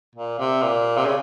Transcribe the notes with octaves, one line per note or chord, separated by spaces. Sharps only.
A#2
C3
A#2
C3
C#3